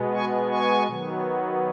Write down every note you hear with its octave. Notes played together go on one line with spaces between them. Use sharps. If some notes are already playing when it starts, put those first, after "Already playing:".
Already playing: B2 G#3 B3
G#5 C#6
G#5 C#6
D#3 F#3 B3